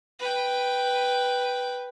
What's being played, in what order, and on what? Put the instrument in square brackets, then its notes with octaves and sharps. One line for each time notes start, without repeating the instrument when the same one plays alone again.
[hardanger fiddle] B4 G5